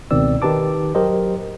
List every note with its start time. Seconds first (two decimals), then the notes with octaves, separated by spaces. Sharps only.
0.11 C#2 B2 D#3 C4 D5 E6
0.42 D#3 D#4 G4 B4 A5 D6
0.95 F#3 G4 A#4 C5 D#5